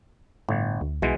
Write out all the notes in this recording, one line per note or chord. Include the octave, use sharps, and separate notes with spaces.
G1 A2
D2
B1 B2 E3 G#3